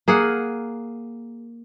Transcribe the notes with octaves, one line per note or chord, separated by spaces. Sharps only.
A#3 G#4 A#4 F#5